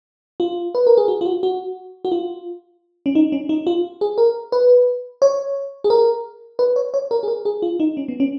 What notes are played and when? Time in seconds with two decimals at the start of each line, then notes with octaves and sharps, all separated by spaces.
0.40 F4
0.75 B4
0.87 A#4
0.97 G#4
1.08 F#4
1.21 F4
1.25 F#4
1.43 F#4
2.05 F#4
2.12 F4
3.06 C#4
3.15 D#4
3.32 C#4
3.49 D#4
3.67 F4
4.01 G#4
4.18 A#4
4.52 B4
5.22 C#5
5.84 G#4
5.90 A#4
6.59 B4
6.76 C#5
6.94 C#5
7.11 A#4
7.23 G#4
7.28 A#4
7.45 G#4
7.62 F4
7.80 D#4
7.97 C#4
8.08 B3
8.20 C#4